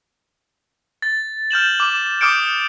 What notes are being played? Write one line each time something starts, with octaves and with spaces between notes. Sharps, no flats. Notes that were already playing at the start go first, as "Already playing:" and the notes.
A6
F6 G6 E7 F#7
D6 E7
D6 D#6 F6 G6 C#7 D7